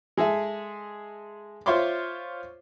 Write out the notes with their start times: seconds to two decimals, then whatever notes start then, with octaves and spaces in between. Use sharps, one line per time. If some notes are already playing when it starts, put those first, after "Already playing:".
0.17 G#3 G#4 A4 E5
1.66 F4 C5 C#5 E5 C6 D6